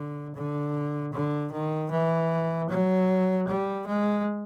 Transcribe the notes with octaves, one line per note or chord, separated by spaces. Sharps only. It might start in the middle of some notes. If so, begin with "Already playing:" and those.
Already playing: D3
D3
D3
D#3
E3
F#3
G3
G#3